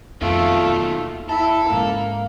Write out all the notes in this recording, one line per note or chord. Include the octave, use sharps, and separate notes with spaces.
F2 B2 D#3 A3 F4
D#2
E4 A4
G#2 C#3 A#3